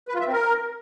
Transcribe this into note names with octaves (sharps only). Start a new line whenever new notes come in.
B4
F4
E5
C4
A#4